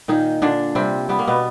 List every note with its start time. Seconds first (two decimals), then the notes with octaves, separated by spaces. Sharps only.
0.08 A#2 D#3 D#4
0.42 A#2 D3 D4
0.75 C3 G3 C4
1.09 G3 B3
1.19 A#3
1.27 B2 B3